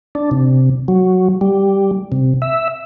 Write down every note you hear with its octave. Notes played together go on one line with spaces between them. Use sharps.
D4
C3
F#3
G3
C3
E5